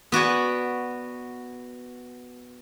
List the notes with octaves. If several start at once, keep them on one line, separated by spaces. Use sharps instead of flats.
B3 F#4 D5 G#5